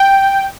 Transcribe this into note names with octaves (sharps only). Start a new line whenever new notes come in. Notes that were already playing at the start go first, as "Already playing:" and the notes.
Already playing: G5